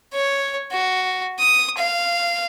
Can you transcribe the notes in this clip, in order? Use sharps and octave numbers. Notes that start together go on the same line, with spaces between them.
C#5
F#4
D#6
F5